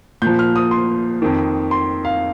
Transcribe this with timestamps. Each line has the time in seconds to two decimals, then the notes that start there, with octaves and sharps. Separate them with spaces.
0.22 A#2 F3 G6
0.39 F6
0.56 D#6
0.71 C6
1.22 F2 D#3
1.71 C6
2.05 F5